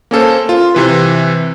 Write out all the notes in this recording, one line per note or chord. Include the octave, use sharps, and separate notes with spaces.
A#3 C#4 A4 C5
F4
C3 E3 B4